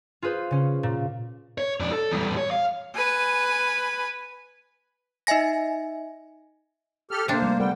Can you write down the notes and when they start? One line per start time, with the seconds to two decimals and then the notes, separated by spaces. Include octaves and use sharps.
0.22 F4 G#4 B4 C5
0.51 C#3 C#4
0.83 A#2
1.58 C#5
1.80 F2 D4
1.92 A4
2.12 E2 G3
2.37 C#5
2.51 F5
2.95 B4 G#5
5.27 D#4 D#5 E5 G#5 A#6
7.11 G4 A4 F6
7.28 C3 A#3 D4 C5
7.42 G3 A3
7.60 D3 G3 B3 A#4 F#5 G5